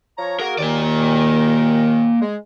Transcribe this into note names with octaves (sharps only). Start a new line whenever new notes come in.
F3 C#5 A#5
A#3 F#4 G#4 A#4
D#2 D#3 A#3 D5
G#3